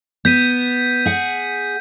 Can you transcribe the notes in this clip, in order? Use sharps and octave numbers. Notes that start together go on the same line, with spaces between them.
B3 G6 B6 D#7
G#4 F#5